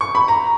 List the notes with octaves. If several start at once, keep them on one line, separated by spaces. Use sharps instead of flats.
C#6
B5
A#5